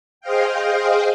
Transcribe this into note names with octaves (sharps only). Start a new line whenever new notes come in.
G#4 C5 D#5 F5 G5